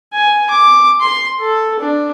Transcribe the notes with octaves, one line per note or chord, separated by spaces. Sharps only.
G#5
D6
C6
A4
D4